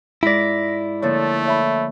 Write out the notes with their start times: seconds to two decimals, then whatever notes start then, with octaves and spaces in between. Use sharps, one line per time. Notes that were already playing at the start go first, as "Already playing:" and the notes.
0.23 G#2 E4 F4 D5 A#6 B6
1.02 D3 F3 A3 A#3 C#5 A6
1.45 C#5 E5 B5